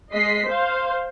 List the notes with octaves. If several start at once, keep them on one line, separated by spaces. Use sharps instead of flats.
G#3 D#5 B6 C7
C5 F5